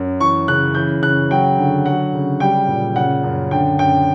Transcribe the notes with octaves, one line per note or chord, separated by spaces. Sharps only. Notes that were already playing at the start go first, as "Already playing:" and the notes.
Already playing: F#2
E3 C#6
C#3 F#6
E3 G6
C#3 F#6
F#3 G5
D3
F#3 F#5
C#3
G3 G5
A#2
C#3 F#5
F#2
D3 G5
F#2 G5